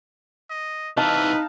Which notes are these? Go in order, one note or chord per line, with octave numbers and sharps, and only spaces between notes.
D#5
C3 E3 D#4 B4 F5 A5